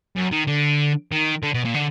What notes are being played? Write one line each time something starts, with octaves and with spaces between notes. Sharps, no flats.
F#2
D#3
D3
D#3
D3
B2
A#2
D3